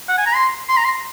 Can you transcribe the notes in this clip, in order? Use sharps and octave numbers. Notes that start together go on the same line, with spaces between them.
F#5
G#5
A#5
C6
C6
A#5
C6